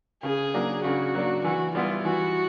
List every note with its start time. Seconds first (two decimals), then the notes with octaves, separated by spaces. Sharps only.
0.23 C#3 G#4
0.54 F#3 A#3 D4
0.84 C#3 F#4
1.15 F#3 A#3 D4
1.44 E3 F#4
1.74 G3 B3 E4 F4
2.05 E3 F#4